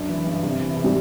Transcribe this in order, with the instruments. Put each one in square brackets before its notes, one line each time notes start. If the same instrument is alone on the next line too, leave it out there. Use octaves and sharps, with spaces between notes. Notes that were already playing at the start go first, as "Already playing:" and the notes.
Already playing: [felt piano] F#2 D4
E3
G2
C3
E3
C3
[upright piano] G3